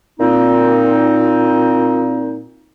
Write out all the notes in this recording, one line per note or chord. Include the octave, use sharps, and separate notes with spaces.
A#2 C4 D#4